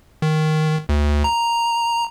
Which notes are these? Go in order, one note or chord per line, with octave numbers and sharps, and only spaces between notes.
D#3
D2
A#5